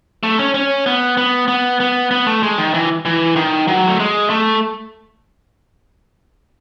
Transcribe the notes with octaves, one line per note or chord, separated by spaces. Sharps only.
A3
C#4
C#4
B3
B3
B3
B3
B3
A3
G#3
D#3
E3
E3
D#3
F#3
A3
G#3
A3